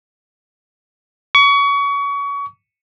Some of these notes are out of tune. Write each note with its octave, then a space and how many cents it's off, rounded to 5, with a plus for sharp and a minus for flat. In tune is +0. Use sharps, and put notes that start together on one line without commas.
C#6 +30